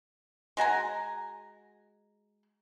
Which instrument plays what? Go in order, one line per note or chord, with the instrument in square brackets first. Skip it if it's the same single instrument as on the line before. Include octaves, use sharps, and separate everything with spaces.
[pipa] G#3 F#4 G#5 A#5